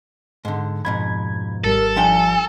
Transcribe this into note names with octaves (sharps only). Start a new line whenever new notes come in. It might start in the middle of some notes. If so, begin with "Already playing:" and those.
G#2 D3
F2 G#2 B2 B5 G#6
G#1 G3 A4 A#4
F3 D4 G5 G#5